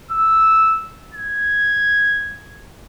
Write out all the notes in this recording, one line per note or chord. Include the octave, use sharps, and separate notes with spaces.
E6
G#6